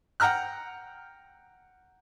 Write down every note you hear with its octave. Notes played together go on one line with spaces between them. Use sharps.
F#5 G5 A#5 F6 F#6